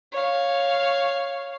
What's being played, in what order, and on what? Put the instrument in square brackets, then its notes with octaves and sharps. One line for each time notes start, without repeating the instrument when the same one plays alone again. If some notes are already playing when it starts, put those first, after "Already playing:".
[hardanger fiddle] C#5 F5